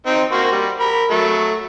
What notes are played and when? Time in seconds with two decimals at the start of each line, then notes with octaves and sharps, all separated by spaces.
0.06 C4 D#4 C5
0.31 A#3 F#4 C5
0.52 G3
0.80 A#4 B5
1.10 F#3 A3